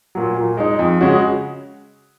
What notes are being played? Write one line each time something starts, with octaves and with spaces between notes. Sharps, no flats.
A#2 F#3
A#2
G#3 D#4
F2
C#3 G#3 C#4 F#4